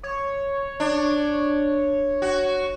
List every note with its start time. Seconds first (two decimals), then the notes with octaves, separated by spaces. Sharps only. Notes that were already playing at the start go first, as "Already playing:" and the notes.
0.03 C#5
0.80 D4
2.22 F#4